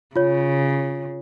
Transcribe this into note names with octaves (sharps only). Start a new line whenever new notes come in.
C#3 F4 C#5